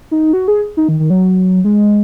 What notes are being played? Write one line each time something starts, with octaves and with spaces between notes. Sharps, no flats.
D#4
F#4
G#4
D#4
D#3
D#3
F#3
G#3